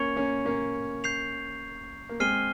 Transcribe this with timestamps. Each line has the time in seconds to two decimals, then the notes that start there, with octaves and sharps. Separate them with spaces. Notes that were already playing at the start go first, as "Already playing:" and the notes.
Already playing: A#3 C#4 C#6 G#6 C#7 F7
0.16 A#3 C#4
0.45 A#3 C#4
1.04 G6 C7 F7
2.09 A#3
2.20 G#3 C4 F6 C7 D#7 G7